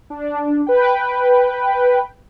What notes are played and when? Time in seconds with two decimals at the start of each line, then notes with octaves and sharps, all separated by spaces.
0.10 D4
0.67 B4 G5